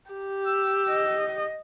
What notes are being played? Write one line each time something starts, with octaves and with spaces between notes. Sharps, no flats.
G4
E6
D#5